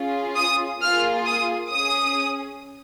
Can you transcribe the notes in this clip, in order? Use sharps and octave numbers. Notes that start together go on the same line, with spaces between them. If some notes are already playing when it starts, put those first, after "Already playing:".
Already playing: C#4 F4 G#4
D#6
A#3 F4 G#4 F6
D#6
C#4 G#4 D#6